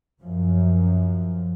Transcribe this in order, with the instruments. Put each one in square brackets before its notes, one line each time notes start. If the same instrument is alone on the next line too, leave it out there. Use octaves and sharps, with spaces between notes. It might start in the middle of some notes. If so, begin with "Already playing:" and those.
[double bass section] F#2 F3